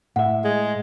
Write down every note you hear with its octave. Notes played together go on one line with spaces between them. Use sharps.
A2 E5 F#5
G#3